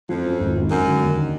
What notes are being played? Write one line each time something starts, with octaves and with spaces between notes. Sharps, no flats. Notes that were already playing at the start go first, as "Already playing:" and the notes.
F2 F3
F#2
G#1
G#1
F#2 G#3
D3
D#2
D#4